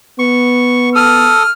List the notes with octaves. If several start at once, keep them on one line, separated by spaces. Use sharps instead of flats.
B3 C#6
A4 D#6 F6